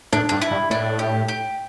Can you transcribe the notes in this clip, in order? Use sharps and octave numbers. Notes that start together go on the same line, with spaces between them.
A2 D4
G2 D4
E4
G2
A2 D4
G4
G4